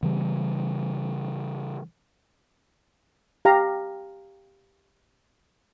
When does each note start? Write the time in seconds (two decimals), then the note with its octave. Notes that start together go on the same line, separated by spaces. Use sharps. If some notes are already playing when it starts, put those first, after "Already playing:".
0.03 C#3 E3 G3
3.45 G4 F5 A#5